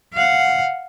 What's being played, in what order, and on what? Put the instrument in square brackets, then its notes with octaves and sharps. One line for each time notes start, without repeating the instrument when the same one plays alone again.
[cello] F5 F#5